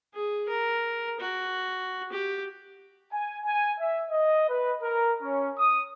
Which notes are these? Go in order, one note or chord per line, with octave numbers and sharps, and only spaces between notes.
G#4
A#4
F#4
G4
G#5
G#5
E5
D#5
B4
A#4
C#4
D#6